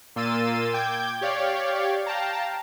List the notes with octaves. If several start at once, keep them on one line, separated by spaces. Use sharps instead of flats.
A#2 A#3 C6 E6 A6 D#7
G5 D6 G6 G#6
G4 C#5 D5 F5
F5 G5 A5 A#5